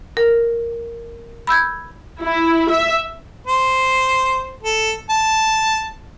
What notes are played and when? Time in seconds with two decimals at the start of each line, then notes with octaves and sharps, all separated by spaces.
0.17 A#4
1.47 B5 E6 G6 G#6
2.21 E4
2.70 E5
3.47 C5
4.63 A4
5.10 A5